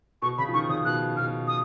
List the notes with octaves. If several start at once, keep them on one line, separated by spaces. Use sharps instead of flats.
B2 C#6
C#3 B5
F3
D#3 C#6
C#3 D#6
B2 F#6
B2 F6
D#6